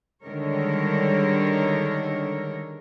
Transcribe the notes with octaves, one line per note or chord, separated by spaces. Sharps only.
D3 D#3 G3 G#3 A#4 C#5